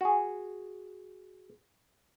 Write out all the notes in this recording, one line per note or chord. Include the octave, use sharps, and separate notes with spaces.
F#4 G#4